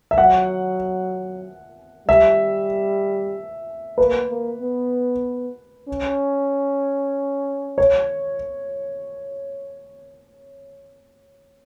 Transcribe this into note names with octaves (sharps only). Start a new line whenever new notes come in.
E5
F#3 F#5
G3 E5
A#3 B4
A#3
B3
C#4
C#5